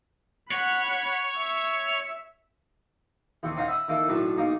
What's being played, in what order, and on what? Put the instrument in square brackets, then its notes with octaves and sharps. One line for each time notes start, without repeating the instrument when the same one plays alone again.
[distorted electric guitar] C#5 [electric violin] F#5 B5
[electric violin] E5
[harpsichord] D#2 C3 C#6
C4 C#4 D#4 F5 F#5
E5 B5 D#6
D#3 A#3 E4 A4
B1 A2 D4 B4 A5
B1 A#3 D#4